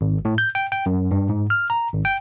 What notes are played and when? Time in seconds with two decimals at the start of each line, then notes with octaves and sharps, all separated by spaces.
0.01 G#1
0.25 A2
0.38 G6
0.55 G5
0.72 G5
0.86 F#2
1.11 G2
1.29 G#2
1.50 F6
1.70 A#5
1.93 G#1
2.05 G5